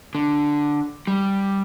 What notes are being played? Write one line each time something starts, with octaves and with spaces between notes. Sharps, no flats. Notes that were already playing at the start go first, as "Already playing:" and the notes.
D3
G3